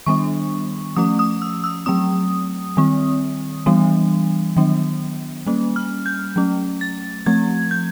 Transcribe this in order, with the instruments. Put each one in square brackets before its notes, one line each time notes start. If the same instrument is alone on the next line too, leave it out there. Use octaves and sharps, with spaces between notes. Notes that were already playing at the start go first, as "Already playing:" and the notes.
[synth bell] D#3 G3 B3 D4 C#6
F3 A3 C#4 D#6
D#6
E6
E6
F#3 A3 C4 D#6
D#3 G3 C4
E3 G3 B3 D4
D#3 F#3 B3 D4
G3 A#3 C#4
F6
G6
F#3 A3 C#4
A6
F3 A3 C4 G#6
G6